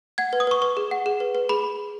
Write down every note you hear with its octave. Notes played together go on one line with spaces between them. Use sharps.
F#5 G#6
B4
D#6
B4 C#6
B4 C#6
G#4
F#5
G#4
B4
B4
G#4 B5